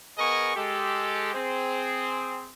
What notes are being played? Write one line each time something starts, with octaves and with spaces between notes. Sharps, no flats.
B3 G#4 A#4 D#5 G#5 C#6
G#3 G4 A4
C4 G#4 C5